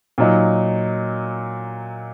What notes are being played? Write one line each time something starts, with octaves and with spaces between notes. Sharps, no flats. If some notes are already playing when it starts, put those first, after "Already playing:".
A#2 F#3 D#4